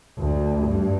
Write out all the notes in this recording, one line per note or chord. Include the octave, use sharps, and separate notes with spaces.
D2
G2